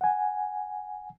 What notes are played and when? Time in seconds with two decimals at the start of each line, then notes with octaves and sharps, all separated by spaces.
0.01 F#5 G#5